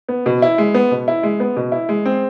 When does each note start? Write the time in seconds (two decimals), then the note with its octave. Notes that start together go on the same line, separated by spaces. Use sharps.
0.08 B3
0.26 B2
0.42 E4
0.58 G#3
0.74 B3
0.91 B2
1.08 E4
1.23 G#3
1.40 B3
1.56 B2
1.72 E4
1.89 G#3
2.05 C4